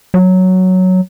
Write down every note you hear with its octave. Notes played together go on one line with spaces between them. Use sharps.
F#3